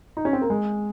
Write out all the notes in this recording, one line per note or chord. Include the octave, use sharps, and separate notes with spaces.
D#4
C#4
C4
A#3
G#3